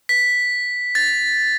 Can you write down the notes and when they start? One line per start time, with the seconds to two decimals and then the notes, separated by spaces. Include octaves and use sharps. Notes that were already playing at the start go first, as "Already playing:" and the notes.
0.09 B6
0.95 A6